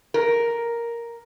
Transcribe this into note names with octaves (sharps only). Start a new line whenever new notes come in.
A#4